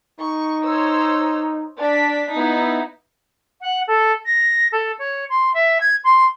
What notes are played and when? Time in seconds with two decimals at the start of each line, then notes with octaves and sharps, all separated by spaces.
0.20 D#4 C#6
0.65 C5 C#5 E6
1.80 D4 B6
2.37 B3 D#4 E4
3.61 F#5
3.87 A4
4.26 A#6
4.73 A4
4.99 C#5
5.30 C6
5.54 E5
5.81 G#6
6.04 C6